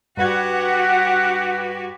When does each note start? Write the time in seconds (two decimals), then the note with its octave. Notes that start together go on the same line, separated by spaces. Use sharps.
0.17 G2 F#4 G4 B4 F#5 G#6